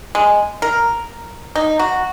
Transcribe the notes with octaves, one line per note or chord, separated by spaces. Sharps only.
G#3
A#4
D#4
F#4